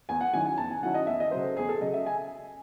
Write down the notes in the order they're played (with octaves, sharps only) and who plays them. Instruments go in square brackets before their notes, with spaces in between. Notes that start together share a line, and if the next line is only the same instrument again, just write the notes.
[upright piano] E2 G#5
F#5
D#3 F#3 C#4 E4 G#5
G#5
E2 A5
G#5
D#3 F#3 C#4 E4 F#5
D#5
E2 E5
D#5
C#3 F#3 C5
A4
E2 G#4
A4
C#3 F#3 D#5
E5
G#5